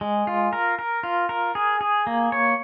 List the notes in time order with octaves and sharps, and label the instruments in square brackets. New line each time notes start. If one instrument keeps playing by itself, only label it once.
[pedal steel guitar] G#3
F4
A#4
A#4
F4
A#4
G#4
G#4
A#3
C#5